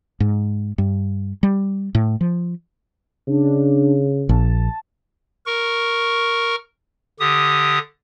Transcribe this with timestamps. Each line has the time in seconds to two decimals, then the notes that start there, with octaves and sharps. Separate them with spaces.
0.20 G#2
0.78 G2
1.43 G3
1.95 A2
2.21 F3
3.28 C#3 D4
4.29 A#1 A5
5.46 A#4 C#6
7.20 D3 G4 D#6